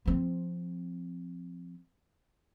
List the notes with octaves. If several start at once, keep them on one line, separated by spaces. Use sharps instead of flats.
F3 C4